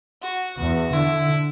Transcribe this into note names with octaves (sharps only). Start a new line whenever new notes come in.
F#4
E2 F#4
D3 E4